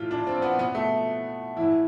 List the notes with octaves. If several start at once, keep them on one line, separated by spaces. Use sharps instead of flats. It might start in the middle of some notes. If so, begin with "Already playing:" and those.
Already playing: A2 E3 F4
D4
C4
B3
B2 B3
A3
A2 E3 E4